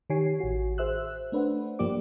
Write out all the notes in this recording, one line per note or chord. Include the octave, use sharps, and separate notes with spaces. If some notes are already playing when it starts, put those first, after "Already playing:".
D#3 G4 C#5 G#5 C7
A1 F#4
G#4 C5 E5 E6 F#6
A3 D4 B4 C5 F#5
G2 F3 A#3 G4 D5 D6